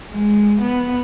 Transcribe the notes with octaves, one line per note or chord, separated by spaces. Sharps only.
G#3
B3